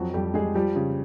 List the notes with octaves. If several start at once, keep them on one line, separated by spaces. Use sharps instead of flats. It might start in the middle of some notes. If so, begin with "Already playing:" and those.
Already playing: F2 F3 F#3 F#4
F2 G3 G4
G3 G#3 G#4
F3 G3 G4
C#3